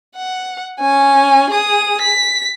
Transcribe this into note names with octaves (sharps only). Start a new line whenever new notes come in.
F#5
C#4 G#5
G#4 D#6
B6